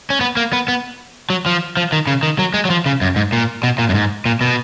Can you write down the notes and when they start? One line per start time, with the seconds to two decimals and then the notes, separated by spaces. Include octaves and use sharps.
0.10 C#4
0.21 B3
0.37 A#3
0.53 B3
0.68 B3
1.30 F#3
1.46 F3
1.77 F3
1.92 D#3
2.07 C#3
2.23 D#3
2.39 F#3
2.54 G#3
2.65 F#3
2.70 F3
2.86 C#3
3.02 F#2
3.16 G#2
3.33 A#2
3.63 B2
3.78 A#2
3.89 F#2
3.94 G#2
4.26 A#2
4.41 B2